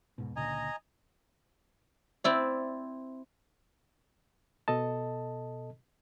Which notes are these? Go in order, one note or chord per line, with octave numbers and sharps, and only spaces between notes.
E1 G#2 B2
C#2 A#2 D3 D#5 G#5 A#5
C4 E4 D5
B2 A4 D#5 A5